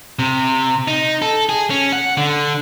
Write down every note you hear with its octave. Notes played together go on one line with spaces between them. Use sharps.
C3
D#4
A4
G#4
C#4
F#5
D3